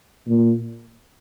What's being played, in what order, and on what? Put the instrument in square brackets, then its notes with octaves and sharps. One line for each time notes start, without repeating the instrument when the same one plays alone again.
[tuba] A#2